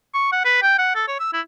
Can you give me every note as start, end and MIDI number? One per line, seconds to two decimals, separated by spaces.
0.14 0.30 85
0.32 0.42 78
0.45 0.58 71
0.62 0.75 79
0.79 0.93 78
0.95 1.03 69
1.08 1.16 73
1.20 1.32 88
1.33 1.41 64